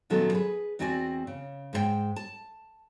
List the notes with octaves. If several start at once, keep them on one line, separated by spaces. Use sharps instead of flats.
A#2 D#3 F#3 B3 C#4 A4
G#4 B4
E2 C4 F#4 D5 G5 G#5
C#3
G#2 B4 G5
A5